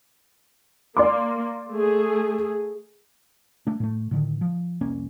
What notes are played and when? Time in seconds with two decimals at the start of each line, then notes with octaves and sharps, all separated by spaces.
0.97 A#3 D5 C6 D6
1.71 A3 G#4
3.67 A3 D4
3.80 A2 A3
4.11 A2 D3 D#3
4.41 F3
4.81 F1 C2 A#3 C#4